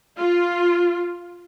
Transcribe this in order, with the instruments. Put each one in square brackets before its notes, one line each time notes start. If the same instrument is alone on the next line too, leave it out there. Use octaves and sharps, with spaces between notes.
[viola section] F4